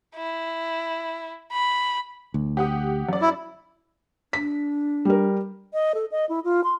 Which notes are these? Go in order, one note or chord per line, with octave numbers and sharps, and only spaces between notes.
E4
B5
D2
G4 F#5 D#6
F#2 D5
E4
D4 B6
G3 A#4
D#5
A4
D#5
E4
F4
C6